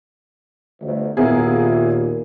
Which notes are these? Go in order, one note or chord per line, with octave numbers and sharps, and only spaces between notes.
G1 D2
D#2 A#2 A#3 B3 E4 G#4